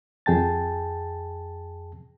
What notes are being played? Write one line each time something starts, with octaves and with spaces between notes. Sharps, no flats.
F2 G#4 G5 A5 A6